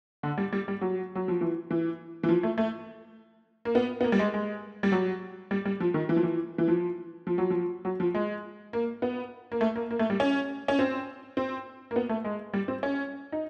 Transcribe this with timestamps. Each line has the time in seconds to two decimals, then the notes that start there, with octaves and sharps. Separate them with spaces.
0.23 D3
0.38 G3
0.53 G3
0.68 G3
0.81 F#3
1.15 F#3
1.28 F3
1.41 E3
1.71 E3
2.23 E3
2.29 F3
2.43 A3
2.58 A3
3.65 A#3
3.75 B3
4.01 B3
4.04 A#3
4.12 G3
4.19 G#3
4.34 G#3
4.83 G3
4.92 F#3
5.51 G3
5.65 G3
5.80 F3
5.94 D#3
6.09 E3
6.16 F3
6.23 E3
6.58 E3
6.68 F3
7.27 F3
7.38 F#3
7.50 F3
7.85 F#3
8.00 F3
8.15 G#3
8.73 A#3
9.02 B3
9.52 A#3
9.61 A3
9.76 A#3
9.91 A#3
9.99 A3
10.10 G3
10.20 C#4
10.68 C#4
10.79 C4
11.37 C4
11.91 A#3
11.96 B3
12.09 A3
12.24 G#3
12.54 G3
12.68 C4
12.83 C#4
13.32 D#4